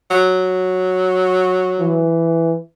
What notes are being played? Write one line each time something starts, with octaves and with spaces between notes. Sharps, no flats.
F#3
E3